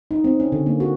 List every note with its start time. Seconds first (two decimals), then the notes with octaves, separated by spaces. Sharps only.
0.11 D#4
0.24 C4
0.40 C#4
0.52 D3
0.66 A#3
0.80 F#4